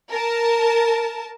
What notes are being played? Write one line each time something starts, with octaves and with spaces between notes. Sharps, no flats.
A#4 A5